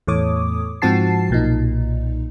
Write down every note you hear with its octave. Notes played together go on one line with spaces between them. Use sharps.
E2 A2 A4 C#5 D6 D#6
G#2 F3 C4 F#4 A5 C7
B1 A#2 D#4